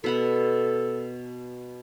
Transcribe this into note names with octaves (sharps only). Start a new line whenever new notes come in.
B2 A4 F#5 B5